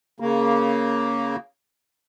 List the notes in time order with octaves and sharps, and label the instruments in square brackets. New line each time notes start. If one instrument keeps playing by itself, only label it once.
[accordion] C#3 A#3